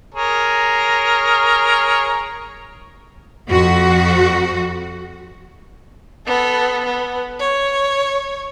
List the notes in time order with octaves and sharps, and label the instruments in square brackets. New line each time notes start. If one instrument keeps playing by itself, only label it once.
[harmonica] G#4 A#4 C#5
[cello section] F2 F#4
[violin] B3 A4
B3
C#5